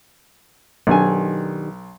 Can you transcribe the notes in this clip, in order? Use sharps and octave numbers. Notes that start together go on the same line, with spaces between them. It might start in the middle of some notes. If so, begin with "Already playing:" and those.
B1 D#3 D4 G4 G#5